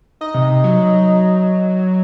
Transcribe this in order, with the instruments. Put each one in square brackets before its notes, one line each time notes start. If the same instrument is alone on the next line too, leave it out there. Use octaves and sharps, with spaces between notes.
[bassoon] D#4 [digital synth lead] D#5
[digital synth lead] C3
F#3